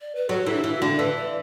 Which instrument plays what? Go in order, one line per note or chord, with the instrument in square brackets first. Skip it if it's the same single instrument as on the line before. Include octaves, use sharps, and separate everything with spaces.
[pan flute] D5
B4
[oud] F#3 [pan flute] A4
[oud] E3
[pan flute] D4
[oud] E3 [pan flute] E4
[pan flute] F#4
[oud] D3
[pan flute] A4
[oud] E3 [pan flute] B4
[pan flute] D5